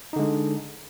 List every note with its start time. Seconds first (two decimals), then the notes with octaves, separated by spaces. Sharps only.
0.13 D#4
0.16 D3
0.19 G#3